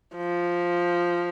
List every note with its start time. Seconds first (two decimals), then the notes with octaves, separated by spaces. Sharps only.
0.16 F3